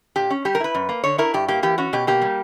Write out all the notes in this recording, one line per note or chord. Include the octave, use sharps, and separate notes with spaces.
A#2 G4
C#4
G3 G4
A#4
E4 B4
F#2
A#3
D3 C#5
E4 A#4
G2 G4
A#3 G4
E3 G4
C#4 F#4
B2 G4
A#3 G4
G3